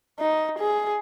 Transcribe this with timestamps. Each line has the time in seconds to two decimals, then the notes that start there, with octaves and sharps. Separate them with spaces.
0.20 D#4
0.59 G#4